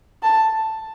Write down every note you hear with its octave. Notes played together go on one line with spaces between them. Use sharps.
A5